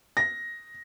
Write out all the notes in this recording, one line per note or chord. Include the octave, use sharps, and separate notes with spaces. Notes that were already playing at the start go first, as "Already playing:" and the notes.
A#6